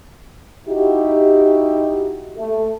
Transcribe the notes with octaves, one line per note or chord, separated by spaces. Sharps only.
D#4 E4 F#4 G4
A3